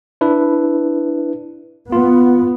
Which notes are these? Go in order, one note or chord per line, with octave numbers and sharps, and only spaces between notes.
D4 E4 B4
B3 F4